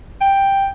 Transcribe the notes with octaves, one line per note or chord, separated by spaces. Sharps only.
G5